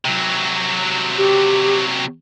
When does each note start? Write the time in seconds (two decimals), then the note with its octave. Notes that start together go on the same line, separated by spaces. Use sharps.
0.05 C3 F#3
1.18 G4